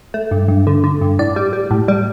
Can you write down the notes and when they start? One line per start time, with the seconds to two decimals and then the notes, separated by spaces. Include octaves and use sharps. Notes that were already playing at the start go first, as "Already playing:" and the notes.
0.14 A3
0.31 G2
0.48 G2
0.67 D3
0.84 D3
1.01 G2
1.19 A2 D5
1.36 G3
1.53 G3
1.71 A2
1.88 G3